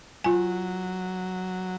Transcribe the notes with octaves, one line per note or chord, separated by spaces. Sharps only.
F#3 F4 G#5